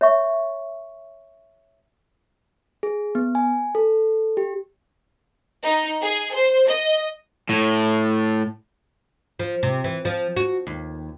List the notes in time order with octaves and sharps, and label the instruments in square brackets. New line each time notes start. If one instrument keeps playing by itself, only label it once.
[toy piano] C#5 E5 C#6
[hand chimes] G#4
B3
G#5
A4
G4
[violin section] D#4
G#4
C5
D#5
[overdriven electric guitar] A2
[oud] F3
C3
E3
F3
F#4
D#2